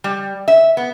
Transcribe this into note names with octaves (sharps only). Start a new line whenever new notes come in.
G3
E5
B3